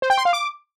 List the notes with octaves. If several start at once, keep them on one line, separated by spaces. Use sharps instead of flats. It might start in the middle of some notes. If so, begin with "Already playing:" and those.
C5
G5
C6
F5
D6